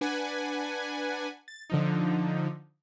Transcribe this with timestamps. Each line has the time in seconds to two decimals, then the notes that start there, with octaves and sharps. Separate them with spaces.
0.01 D4 B4 F#5 G#5
1.48 A6
1.70 D3 F3 D#4